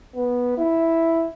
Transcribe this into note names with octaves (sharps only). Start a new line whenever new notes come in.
B3
E4